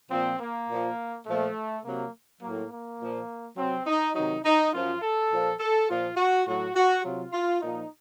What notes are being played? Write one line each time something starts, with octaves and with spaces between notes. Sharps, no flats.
A#2 F3 C4
A#3
A#2 F3
A#2 F3 A3
C3 F#3 A#3
A2 F#3 A#3
A#3
A#2 F3
C3 F#3 C4
D#4
C3 D#3 F#3 D#4
D#4
F#2 F3 F4
A4
A#2 F3
A4
A#2 F3 F4
F#4
A2 F#3 F#4
F#4
C3 F#3 F4
F4
A#2 F3 D#4